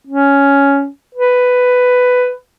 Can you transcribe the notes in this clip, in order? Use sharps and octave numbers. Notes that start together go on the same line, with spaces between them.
C#4
B4